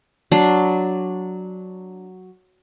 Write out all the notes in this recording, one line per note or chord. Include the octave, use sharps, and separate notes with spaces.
F#3 D4 C6